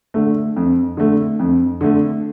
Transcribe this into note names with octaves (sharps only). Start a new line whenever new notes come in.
D3 A3
F2
D3 A3
F2
D3 A3